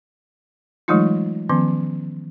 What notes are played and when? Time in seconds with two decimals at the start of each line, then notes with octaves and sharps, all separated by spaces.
0.88 E3 F#3 G#3 A3 D#4 F4
1.49 D#3 F3 B3 C#4